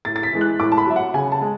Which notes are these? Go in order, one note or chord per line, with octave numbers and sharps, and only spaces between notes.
A2 A6
A6
B6
E3 G#3
F#6
A2 D6
A5
B5
F#3 E5
F#5
C#3 G#5
A5
G#3